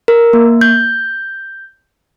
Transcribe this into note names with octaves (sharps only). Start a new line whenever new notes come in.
A#4
A#3
G6